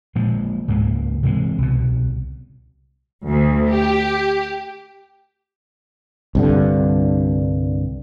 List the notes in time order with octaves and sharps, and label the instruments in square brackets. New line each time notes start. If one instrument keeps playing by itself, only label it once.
[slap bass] A#2 F3 G#3
C#2 G#2 G#3 A#3
C3 E3 F#3 G#3
C2 B2
[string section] D2
G4
[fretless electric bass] C2 G2 D3